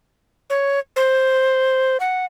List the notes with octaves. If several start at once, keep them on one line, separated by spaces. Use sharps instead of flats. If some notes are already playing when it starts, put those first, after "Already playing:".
C#5
C5
F#5